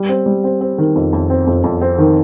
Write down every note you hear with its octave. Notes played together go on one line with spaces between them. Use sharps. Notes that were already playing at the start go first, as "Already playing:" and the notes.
Already playing: G3
C4
G3
C4
C4
D#3
F2
F2
C4
F2
F2
C4
D#3